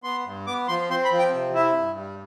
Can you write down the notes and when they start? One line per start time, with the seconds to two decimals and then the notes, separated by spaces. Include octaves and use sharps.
0.04 B3 C6
0.25 G2
0.47 B3 D6
0.68 F3 C6
0.89 C4 C6
1.05 B5
1.11 F3
1.19 G5
1.33 C3
1.54 E4 E5
1.76 G2
1.97 G3